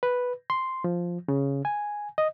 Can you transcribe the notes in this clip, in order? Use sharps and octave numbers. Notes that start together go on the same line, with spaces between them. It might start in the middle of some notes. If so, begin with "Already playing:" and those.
B4
C6
F3
C#3
G#5
D#5